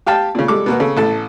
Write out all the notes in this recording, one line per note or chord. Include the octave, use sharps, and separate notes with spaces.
G4 F5 G5 A5
A#2 C#3
G3 G#3 A4 D6
B2 A#3 B3
C#3 A4
A1 A4 A5